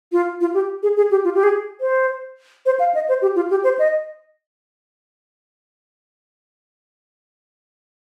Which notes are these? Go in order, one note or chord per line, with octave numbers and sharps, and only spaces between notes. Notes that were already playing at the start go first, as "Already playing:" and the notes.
F4
F4
G4
G#4
G#4
G4
F4
G4
G#4
C5
C5
F5
D#5
C5
G4
F4
G4
C5
D#5